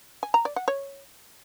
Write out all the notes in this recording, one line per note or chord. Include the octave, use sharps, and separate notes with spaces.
G#5
A#5
D5
F#5
C#5